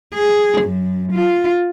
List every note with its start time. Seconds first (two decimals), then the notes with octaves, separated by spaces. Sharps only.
0.14 G#4
0.62 F#2
1.12 F4